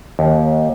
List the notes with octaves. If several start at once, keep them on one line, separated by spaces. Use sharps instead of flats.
D#2